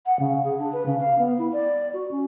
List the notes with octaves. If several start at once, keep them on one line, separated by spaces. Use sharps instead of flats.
F#5
C#3
G#4
D4
B4
C#3
F5
B3
E4
D5
F#4
C#4